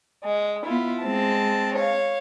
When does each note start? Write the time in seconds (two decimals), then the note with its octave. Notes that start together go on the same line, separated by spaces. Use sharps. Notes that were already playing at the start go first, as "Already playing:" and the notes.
0.22 G#3
0.64 B3 E4 F4
1.02 G#3 C4 A5
1.74 C#5 F5